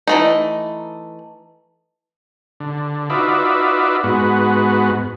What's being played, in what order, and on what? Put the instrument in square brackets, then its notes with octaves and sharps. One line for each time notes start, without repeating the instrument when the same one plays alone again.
[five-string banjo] E3 A3 D#4
[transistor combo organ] D3
D#4 F4 F#4 B4 D5 E5
G#2 B3 F#4